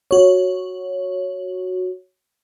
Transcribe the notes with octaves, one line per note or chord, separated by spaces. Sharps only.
F#4 C#5